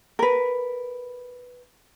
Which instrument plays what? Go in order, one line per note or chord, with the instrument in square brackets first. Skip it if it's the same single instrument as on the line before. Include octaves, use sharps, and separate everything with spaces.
[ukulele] A#4 B4